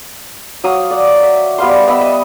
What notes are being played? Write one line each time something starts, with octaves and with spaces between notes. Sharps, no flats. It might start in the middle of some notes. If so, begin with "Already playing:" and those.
F#3 F5 D#6
D5 F#5
E5
G3 B3 F5 C6
B3 D#5 E5 E6
D#5